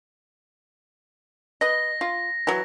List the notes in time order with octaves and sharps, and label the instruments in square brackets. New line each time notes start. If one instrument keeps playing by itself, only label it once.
[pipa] B4 D#5 [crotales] A#6
[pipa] F4
E3 F#3